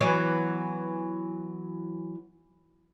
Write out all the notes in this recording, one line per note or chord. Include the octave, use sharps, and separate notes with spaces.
E3 F#3 B3